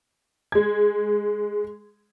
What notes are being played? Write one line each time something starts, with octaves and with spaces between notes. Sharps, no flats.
G#3 G#6